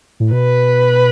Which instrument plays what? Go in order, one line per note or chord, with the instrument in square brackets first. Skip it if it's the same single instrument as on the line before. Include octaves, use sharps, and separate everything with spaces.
[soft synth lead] A2
[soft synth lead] B2 [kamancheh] B4